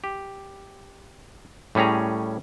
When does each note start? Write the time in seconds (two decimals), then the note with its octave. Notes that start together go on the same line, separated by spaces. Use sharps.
0.04 G4
1.75 A2 G3 C#4 G#4 A#5